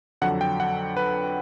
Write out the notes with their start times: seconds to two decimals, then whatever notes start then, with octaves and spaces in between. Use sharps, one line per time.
0.22 F2 D3 F#3 F#5
0.41 G5
0.60 F#5
0.97 B4